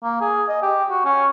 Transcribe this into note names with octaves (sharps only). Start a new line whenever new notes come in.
A#3
G#4
D#5
G4
F#4
C#4